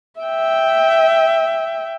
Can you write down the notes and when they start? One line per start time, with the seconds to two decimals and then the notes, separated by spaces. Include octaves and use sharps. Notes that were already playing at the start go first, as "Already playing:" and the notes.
0.20 E5 G5